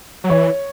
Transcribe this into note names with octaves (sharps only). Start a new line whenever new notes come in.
F#3
E3 C#5